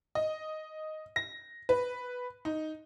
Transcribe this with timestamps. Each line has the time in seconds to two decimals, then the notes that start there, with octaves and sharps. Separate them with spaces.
0.15 D#5
1.16 A#6
1.69 B4
2.45 D#4